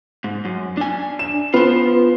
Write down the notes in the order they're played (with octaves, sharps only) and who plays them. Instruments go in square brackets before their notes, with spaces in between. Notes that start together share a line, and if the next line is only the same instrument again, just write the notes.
[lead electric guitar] G#2
F#2
D4 G#5
[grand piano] E7
[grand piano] B3 [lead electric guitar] F4 C5